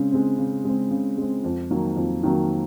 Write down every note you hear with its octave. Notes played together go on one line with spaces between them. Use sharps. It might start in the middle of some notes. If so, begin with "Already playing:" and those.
Already playing: C#3 G#3 C4
G#3 C4
C#3
G#3 C4
C#3
G#3 C4
F2
D#3 F#3 A#3
F2
D#3 F#3 A#3